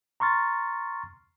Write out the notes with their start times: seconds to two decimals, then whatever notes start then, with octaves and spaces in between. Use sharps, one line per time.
0.20 A#5 C6 C#6 F6 A6